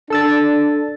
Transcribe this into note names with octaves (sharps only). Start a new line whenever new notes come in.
D4 A4 E6 A6